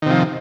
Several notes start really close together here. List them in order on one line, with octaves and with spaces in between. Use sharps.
D#3 C3 F3